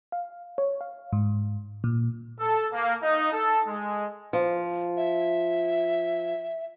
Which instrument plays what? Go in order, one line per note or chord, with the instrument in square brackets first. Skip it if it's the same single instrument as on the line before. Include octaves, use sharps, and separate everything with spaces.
[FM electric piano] F5
C#5
F5
G#2
A#2
[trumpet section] A4
A#3
D#4
A4
G#3
[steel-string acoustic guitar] F3
[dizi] E5